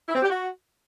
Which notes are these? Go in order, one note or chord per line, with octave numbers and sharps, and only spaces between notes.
E4
C4
G4
F#4